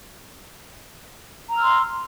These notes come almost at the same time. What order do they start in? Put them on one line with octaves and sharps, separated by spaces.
A#5 E6 F6 C6